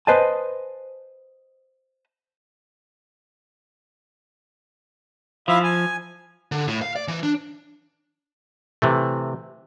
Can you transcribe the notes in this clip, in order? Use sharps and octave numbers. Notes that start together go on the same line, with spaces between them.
B4 C5 D#5 G#5 A5
F3 E4 E5 F5
G#5
D3
A2
F5
D5
E3
D4
C3 E3 A3